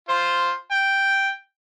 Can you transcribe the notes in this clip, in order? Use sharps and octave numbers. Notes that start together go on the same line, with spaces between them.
F4 C5
G5